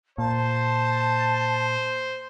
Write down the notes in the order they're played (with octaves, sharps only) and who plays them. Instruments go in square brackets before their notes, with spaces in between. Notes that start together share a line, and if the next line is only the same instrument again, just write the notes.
[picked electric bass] A#2 [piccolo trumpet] C5 [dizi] A5